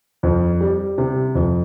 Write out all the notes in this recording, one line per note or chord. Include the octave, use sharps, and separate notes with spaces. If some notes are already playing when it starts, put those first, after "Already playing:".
F2
G3
C3
F2